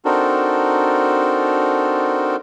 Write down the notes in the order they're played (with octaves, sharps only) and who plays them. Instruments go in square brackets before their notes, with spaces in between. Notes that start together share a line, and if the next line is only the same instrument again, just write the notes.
[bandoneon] C4 D4 D#4 F#4 A4 A#4